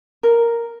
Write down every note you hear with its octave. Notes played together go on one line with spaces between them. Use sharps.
A#4